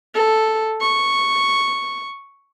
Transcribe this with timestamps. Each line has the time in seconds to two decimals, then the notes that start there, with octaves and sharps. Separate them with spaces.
0.15 A4
0.81 C#6